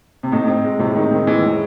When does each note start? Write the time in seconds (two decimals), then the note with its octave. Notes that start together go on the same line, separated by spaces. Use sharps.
0.23 C3
0.32 A2 D#4
0.48 C4
0.64 G#3
0.79 A2 C3
0.95 D#3 D#4
1.11 D#3 C4
1.27 E3 G#3
1.43 A2